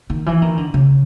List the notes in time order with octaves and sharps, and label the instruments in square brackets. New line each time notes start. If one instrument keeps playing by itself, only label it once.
[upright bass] D#3
E3
D#3
D3
C#3